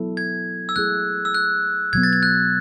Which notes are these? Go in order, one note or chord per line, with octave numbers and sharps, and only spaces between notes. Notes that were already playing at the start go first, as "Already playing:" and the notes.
Already playing: F#3 B3 E4 A4
G#6
E6
F#3 A3 E4 G#4 F#6
E6
F#6
B2 F#3 B3 G#6
A6
G#6
F#6